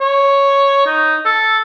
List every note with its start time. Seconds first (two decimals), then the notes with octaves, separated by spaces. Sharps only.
0.01 C#5
0.87 D#4
1.26 A4